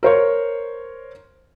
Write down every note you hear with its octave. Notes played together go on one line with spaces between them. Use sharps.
A#4 C5 C#5